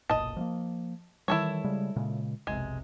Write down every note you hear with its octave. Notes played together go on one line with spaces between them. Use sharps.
F#1 B1 A#2 D#5 A5
F3 A3 A#3
D#3 E3 G3 E4 A4 C#5
C#3 G3 G#3
A#2 C#3 G#3
F1 B1 C3 G#3